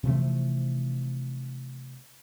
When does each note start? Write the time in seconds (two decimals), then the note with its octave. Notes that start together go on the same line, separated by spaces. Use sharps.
0.03 C3 E3 F3 A3